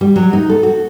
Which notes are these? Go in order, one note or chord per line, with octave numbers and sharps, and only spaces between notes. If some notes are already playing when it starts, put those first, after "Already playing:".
G3
F#3
D#4
A4
F#4